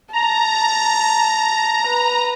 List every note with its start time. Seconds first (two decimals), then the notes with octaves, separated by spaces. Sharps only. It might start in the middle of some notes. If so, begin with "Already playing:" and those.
0.13 A5 A#5
1.87 B4